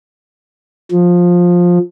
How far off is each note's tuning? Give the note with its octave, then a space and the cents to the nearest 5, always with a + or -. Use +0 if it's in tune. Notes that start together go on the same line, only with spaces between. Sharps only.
F3 +15